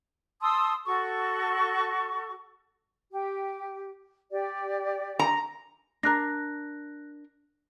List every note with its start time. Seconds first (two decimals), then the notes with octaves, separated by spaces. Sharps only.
0.41 A5 C6 D#6 E6
0.85 F#4 A4 C#6
3.11 G4
4.31 G4 D5
5.19 A#5
6.03 D4 A#4 F#6 A#6